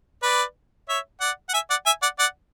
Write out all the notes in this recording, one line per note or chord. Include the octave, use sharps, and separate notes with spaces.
B4 D5
C#5 E5
D5 F#5
F#5
E5 G#5
D5 F#5
E5 G#5
D5 F#5
D5 F#5